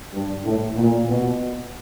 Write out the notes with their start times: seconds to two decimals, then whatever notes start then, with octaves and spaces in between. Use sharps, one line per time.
0.14 G2
0.45 A2
0.77 A#2
1.09 B2